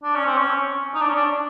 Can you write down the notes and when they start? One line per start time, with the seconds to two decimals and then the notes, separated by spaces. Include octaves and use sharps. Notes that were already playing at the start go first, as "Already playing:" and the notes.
0.03 D4
0.15 C#4
0.26 C4
0.37 C#4
0.94 D#4
1.01 D4
1.08 C#4
1.16 D4